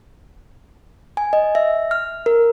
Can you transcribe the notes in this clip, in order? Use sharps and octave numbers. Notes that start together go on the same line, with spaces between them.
G#5
D#5
E5
F6
A#4